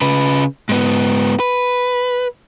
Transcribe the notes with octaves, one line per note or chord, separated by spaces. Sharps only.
C#3 B4
G#2 B3
B4